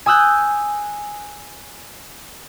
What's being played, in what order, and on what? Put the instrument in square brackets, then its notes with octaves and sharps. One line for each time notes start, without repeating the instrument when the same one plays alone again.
[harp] G#5 D#6 E6 F#6 G6